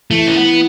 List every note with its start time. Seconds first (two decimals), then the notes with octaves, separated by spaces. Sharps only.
0.11 E3 A3
0.27 C#4
0.36 B3